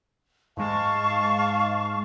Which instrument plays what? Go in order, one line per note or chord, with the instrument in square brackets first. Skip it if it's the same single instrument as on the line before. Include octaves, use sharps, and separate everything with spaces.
[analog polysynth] G#2 G#3 [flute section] F5 A5 C#6